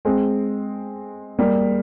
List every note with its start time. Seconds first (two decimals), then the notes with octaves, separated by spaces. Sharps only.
0.05 G#3 C4
1.39 G3 A#3